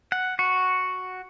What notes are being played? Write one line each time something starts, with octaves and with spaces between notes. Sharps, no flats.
F#5
F#4